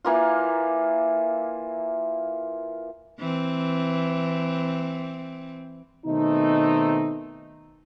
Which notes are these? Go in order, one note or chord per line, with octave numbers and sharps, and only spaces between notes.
E3 A#3 F4
E3 C4
B2 D#3 A3 C4 D#4